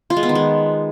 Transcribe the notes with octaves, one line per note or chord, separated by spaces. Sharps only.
F4
G#3
B3
D#3
G#3